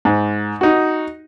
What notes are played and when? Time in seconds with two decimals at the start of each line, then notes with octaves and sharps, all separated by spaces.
0.05 G#2
0.61 D#4 F#4